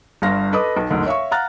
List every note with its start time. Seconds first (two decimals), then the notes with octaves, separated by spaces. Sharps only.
0.22 G1 G2 F5 A#6
0.53 A4 B4 D#5 D6 D#6
0.77 B1
0.90 F#1 D2 G#2
1.06 C#5 E5 F5 C#6
1.31 F5 F#5 A#5 F6 F#6 A6